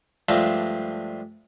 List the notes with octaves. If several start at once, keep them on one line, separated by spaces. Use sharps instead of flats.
G2 F3 G#3 A3 D4 F4